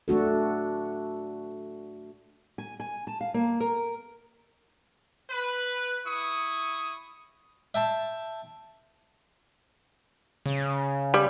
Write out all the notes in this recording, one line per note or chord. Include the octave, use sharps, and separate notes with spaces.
A3 D4 F#4 A4
G#5
G#5
A5
F5
A#3
A#4
B4
E4 C#6 D#6
E5 G5 A5 C6
C#3
G3